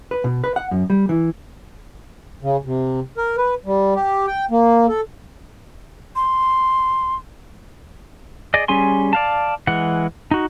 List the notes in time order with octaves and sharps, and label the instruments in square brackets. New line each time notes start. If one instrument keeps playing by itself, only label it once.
[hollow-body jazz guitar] B4
B2
B4
F#5
F#2
G3
E3
[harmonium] C#3
C3
A#4
B4
G3
G4
G5
A#3
A4
[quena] C6
[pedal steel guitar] G#4 D5 D#5
G3 C#4 G#4 G#5 C6
D5 F5 A5
E3 G#3 F#5
D#4 F#4